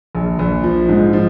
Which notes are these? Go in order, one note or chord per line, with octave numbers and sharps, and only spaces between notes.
A#1
A#1
F3
G#2
F3